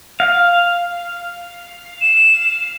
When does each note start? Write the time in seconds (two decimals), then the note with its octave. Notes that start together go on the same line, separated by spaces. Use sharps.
0.20 F5
2.01 E7